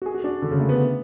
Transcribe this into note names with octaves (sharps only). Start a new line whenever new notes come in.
F#4
G#4
F#4
D4
D3
C#3
A3
B3